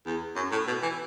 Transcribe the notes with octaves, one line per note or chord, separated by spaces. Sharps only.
E2
F#2
A2
B2
E3